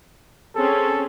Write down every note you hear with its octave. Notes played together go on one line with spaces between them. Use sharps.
C4 C#4 G#4 A4